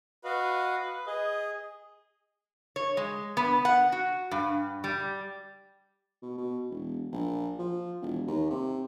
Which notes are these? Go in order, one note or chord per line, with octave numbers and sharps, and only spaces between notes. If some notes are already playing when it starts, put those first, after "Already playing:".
F#4 B4 D#5 F5
G#4 D#5
C#5
G#3
B3
F#5
F#4
G2
G3
B2
B2
E1
A#1
F3
E1
D#2
C3